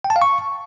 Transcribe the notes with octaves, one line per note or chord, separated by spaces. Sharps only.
G5
A5
F5
C#6